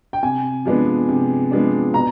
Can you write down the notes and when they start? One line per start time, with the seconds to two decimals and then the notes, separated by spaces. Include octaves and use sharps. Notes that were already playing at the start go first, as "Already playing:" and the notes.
0.13 G5
0.23 C3 G#5
0.65 F3 G#3 B3 D4
1.09 C3
1.51 F3 G#3 B3 D4
1.94 B2 A#5